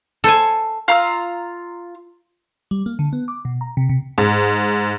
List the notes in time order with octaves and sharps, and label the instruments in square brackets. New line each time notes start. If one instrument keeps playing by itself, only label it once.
[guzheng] A4 C5 G#5
[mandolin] F4 A#5 E6
[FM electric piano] G3
A#3
D3
B3
D6
B2
A#5
C3
C3
[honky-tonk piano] G#2